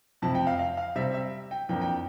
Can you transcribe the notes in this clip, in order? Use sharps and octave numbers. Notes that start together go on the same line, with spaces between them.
F2 C3 F3 A5
G5
F5
F5
F5
C3 G3 C4 E5
E5
G5
F2 E3 A#3 D4 G5
G5